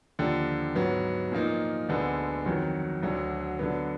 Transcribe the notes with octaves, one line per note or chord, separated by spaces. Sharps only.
D#2 D3 F3
G#2 F#3 B3
A#2 F3 A#3 D#4
D2 D3 G#3 B3
F2 D#3 F#3
D2 D3 F#3
D3 F#3 B3